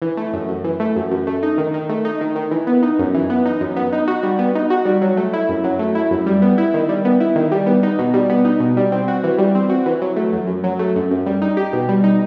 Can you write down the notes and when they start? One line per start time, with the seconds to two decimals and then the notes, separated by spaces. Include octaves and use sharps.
0.02 E3
0.17 A3
0.33 F#2
0.49 F#2
0.64 E3
0.80 A3
0.96 F#2
1.11 F#2
1.27 A3
1.43 D#4
1.58 D#3
1.74 D#3
1.89 A3
2.05 D#4
2.21 D#3
2.36 D#3
2.51 E3
2.67 B3
2.83 D#4
2.99 F#2
3.14 E3
3.30 B3
3.46 D#4
3.61 F#2
3.76 B3
3.92 D#4
4.08 F#4
4.23 G3
4.39 B3
4.55 D#4
4.70 F#4
4.85 G3
5.02 F#3
5.17 A3
5.33 E4
5.49 F#2
5.64 F#3
5.79 A3
5.95 E4
6.11 F#2
6.26 G3
6.42 B3
6.58 E4
6.74 D#3
6.89 G3
7.05 B3
7.20 E4
7.36 D#3
7.52 G3
7.66 B3
7.83 D#4
7.99 B2
8.14 G3
8.30 B3
8.45 D#4
8.60 B2
8.77 G3
8.92 C4
9.08 F#4
9.24 E3
9.38 G3
9.55 C4
9.70 F#4
9.86 E3
10.02 F#3
10.16 A3
10.32 F#2
10.48 F#2
10.64 F#3
10.79 A3
10.95 F#2
11.11 F#2
11.26 G3
11.42 D#4
11.57 G4
11.73 B2
11.89 G3
12.04 D#4